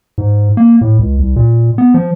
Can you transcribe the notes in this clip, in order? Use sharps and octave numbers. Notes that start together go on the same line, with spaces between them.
G#2
A#3
A2
C#2
C2
A#2
B3
F3